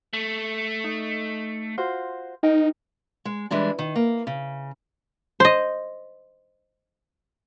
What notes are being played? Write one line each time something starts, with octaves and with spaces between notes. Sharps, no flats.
A3
D#4
F4 F#4 C5
D#4 A#4 D#5 G5
G#3
E3 G3 G#3 D4
D#3
A#3
C#3
C5 D#5